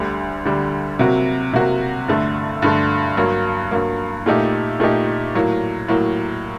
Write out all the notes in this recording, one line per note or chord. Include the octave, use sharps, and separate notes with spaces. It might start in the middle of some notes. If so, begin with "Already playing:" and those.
Already playing: D2 D3 G3
D2 D3 G3
C3 F#3 A#3 F#4
C3 F#3 A#3 F#4
G2 D3 A3
G2 D3 A3
G2 F#3 A#3
G2 F#3 A#3
A#2 A3 D#4 G4
A#2 A3 D#4 G4
A2 F#3 A#3
A2 F#3 A#3